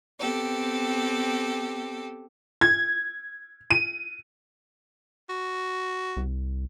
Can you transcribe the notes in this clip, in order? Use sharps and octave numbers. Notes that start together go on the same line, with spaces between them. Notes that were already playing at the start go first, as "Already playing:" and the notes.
B3 C4 G4 A4
G#6
D#7
F#4
C2